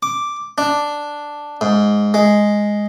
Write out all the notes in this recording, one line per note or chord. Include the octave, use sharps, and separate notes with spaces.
D6
D4
G#2
G#3